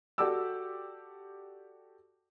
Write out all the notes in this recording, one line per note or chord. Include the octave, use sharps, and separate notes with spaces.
F#4 G4 A4 D5 D6 E6